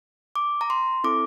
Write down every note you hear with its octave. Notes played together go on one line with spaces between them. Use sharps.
D6
A#5
C6
C4 E4 A4 D6